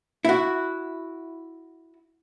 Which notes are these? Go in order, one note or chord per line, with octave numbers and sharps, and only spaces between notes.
E4 F#4